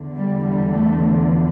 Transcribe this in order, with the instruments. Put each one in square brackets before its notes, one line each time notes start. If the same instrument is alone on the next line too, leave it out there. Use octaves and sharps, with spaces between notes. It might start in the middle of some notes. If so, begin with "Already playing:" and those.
Already playing: [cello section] E2 D3
G3
G3
A3
F3